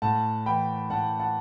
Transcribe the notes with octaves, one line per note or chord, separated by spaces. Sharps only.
A2 F#5 A5
E3 G5 B5
A2 F#5 A5
F#5 A5